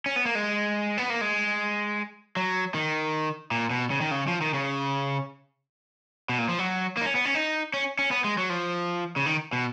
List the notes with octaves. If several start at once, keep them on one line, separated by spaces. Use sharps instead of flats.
C#4
B3
A#3
G#3
B3
A#3
G#3
F#3
D#3
A#2
B2
C#3
D#3
C#3
F3
D#3
C#3
B2
A#2
F3
F#3
A#3
D#4
C#4
B3
C#4
D#4
C#4
C#4
B3
G#3
F#3
F3
C#3
D#3
B2